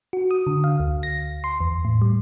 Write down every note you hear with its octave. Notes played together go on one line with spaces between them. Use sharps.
F#4
D#6
D3
F5
D2
A#6
C6
E2
A2
G3